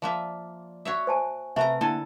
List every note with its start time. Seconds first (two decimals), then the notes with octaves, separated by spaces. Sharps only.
0.02 F3 A#3 D5 E5
0.85 F#4 C#5 E5
1.07 C5 G#5 A5
1.56 C3 A3 A#4 B4 E5 F#5 A#5
1.81 D3 A#3 E4 A4 F#5 G#5 A5